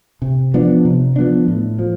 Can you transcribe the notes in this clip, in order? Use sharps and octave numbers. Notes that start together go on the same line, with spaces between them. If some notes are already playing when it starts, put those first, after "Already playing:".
C3
F3 B3 D4
C3
F3 B3 D4
A2
F3